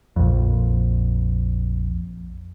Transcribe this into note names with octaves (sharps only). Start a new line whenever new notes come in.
A#1 F2